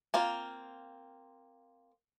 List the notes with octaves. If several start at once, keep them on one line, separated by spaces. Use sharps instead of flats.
A#3 C4 F4